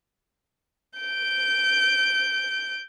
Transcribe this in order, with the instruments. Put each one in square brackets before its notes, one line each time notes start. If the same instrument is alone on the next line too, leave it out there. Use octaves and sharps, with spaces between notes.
[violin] G6 D7